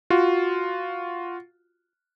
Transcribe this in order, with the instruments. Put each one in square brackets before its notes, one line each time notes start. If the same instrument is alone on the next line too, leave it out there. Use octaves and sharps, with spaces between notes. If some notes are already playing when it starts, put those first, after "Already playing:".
[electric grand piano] F4 F#4